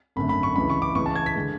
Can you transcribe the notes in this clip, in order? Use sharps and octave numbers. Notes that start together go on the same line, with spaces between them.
G#1 F#2 D3 A3 B5
B5
C#6
C#2 C#3 E3 B5
C#6
D6
C#2 C#3 E3 C#6
A5
G#6
B6
D3 G#3